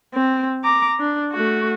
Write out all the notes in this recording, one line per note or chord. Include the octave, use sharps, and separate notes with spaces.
C4
A#5 D6
D4
A3 F#4